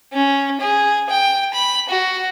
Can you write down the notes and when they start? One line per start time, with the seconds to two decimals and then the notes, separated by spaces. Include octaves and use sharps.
0.13 C#4
0.60 G#4
1.09 G5
1.53 B5
1.89 F#4